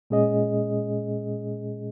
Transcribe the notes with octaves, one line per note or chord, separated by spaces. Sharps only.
A#2 G#3 C#4 G#4 D#5